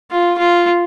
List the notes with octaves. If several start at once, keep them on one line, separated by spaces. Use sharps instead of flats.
F4
F4